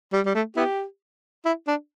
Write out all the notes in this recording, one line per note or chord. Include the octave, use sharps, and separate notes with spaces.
G3
G3
A3
B3 E4 G4
E4
D4